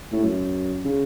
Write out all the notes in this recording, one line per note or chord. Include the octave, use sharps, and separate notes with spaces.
A2
F#2
C#3